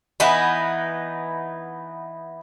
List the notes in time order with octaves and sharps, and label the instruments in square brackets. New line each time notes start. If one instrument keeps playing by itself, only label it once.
[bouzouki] E3 B3 D#4